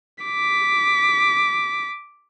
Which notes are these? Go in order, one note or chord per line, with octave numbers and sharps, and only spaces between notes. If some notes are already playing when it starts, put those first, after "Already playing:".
D6 B6